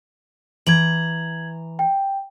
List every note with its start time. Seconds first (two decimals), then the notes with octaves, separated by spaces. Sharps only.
0.67 E3 A#5 G#6 F#7
1.79 G5